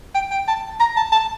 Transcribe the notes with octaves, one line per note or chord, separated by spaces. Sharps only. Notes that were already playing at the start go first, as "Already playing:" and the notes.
G5
G5
A5
A#5
A5
A5